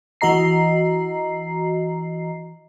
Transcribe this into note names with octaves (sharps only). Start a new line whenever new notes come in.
E3 F#4 D#5 A#5 C7